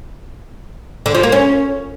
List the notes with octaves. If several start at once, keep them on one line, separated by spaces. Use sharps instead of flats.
D3
F3
A#3
C#4